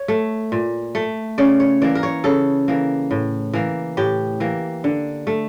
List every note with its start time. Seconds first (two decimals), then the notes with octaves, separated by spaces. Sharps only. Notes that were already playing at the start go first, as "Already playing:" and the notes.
Already playing: C#5
0.08 A3
0.52 A#2
0.95 A3
1.38 C#3 D5
1.60 C#5
1.82 E3 A#3 D5
1.95 A#4
2.03 C#5
2.24 C#3 A4
2.68 E3 A#3
3.11 A2
3.53 E3 A#3
3.97 A2 G4
4.40 E3 A#3
4.84 D3
5.27 A3